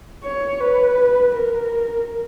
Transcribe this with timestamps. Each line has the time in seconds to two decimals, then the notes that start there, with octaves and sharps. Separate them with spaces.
0.24 C#5
0.60 B4
1.36 A#4